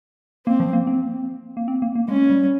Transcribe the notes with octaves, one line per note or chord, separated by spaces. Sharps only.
A#3 C4
F3
A#3
C4
A#3
C4
A#3
A#3
G#3 C#4
G3